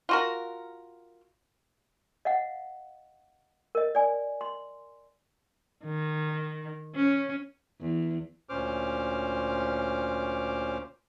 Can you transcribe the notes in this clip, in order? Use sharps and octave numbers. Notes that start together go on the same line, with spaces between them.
F4 F#4 A#4
D#5 F5 F#5
A#4 D#5
D5 G#5
C6
D#3
C#4
E2
D2 A#2 C#4 C5 D6 F6